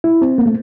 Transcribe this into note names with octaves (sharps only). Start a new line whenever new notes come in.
E4
C4
A#3
A3